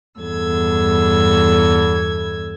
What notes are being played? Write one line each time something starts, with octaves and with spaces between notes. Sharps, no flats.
E2 G2 A4 E6 G#6